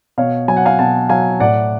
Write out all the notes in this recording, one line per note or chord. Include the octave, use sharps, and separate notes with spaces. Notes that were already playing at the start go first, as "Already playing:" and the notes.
B2 C#5 F5
F#3 G#5
F#5
F5 G#5
B2 F#5 A5
F#3 F5 G#5
A2 D5 F#5